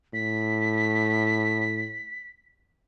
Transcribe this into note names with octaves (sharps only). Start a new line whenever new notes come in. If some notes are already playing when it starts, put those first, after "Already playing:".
A2 B6